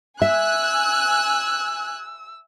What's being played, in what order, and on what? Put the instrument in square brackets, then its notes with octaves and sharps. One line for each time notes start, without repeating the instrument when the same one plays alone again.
[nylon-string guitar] E5 [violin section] G#5 F#6 [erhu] E6